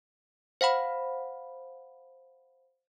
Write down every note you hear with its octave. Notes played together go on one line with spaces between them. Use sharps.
C5 F5 F#5 B5